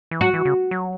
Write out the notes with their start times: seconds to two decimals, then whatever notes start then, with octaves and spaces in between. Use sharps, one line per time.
0.11 E3
0.21 F#3 F#4
0.34 E3
0.45 C#3
0.71 F#3